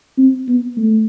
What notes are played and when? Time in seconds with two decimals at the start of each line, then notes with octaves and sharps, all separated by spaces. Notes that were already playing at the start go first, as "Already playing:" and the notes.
0.18 C4
0.48 B3
0.77 A3